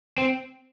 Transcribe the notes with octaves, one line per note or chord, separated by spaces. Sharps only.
C4